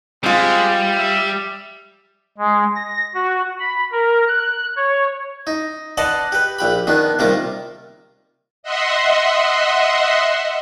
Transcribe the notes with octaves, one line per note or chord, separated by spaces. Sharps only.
G3 G#3 C4 F4
E5
G#3
A#6
F#4
B5
A#4
F#6
C#5
D#4
B4 D5 D#5 F#5 A5 C6
G4 B4
A#1 G4 B5
D#3 B3 D4
C3 D#3 G3 A#3 F4 D6
D#5 E5 F#5 C6